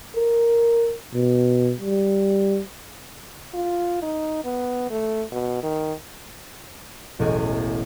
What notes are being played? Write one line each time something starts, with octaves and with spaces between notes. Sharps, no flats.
A#4
B2
G3
F4
D#4
B3
A3
B2
D#3
E1 A1 G#5